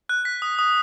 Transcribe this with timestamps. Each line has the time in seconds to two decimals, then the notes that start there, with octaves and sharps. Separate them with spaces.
0.09 F#6
0.25 B6
0.42 D#6
0.59 D#6